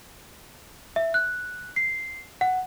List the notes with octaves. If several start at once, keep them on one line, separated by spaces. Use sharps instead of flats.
E5
F#6
C7
F#5